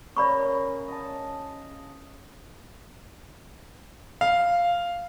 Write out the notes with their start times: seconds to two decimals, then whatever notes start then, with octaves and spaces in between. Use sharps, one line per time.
0.17 C#3 A#4 D5 B5 C#6
0.88 D#5 A5
4.21 F5